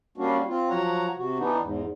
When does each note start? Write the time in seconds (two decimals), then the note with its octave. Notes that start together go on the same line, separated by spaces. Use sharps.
0.18 G3 A#3 C#4 D4 F#4
0.48 C4 F4
0.70 F3 F#3 C#5 F#5 A#5
1.17 C3 F#4
1.39 E3 B3 D4 D#4
1.62 E2 G#2